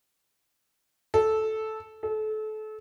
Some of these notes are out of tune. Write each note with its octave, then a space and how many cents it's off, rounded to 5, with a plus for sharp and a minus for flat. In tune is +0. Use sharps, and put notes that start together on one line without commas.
A4 -10
A4 -30